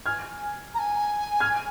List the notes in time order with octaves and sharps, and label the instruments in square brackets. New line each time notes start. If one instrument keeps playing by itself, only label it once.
[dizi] G#5 [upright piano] F6 G#6
[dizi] A#5
G#5
[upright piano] F6 G#6